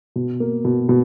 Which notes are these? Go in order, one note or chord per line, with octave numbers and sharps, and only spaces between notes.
B2
A#3
B2
B2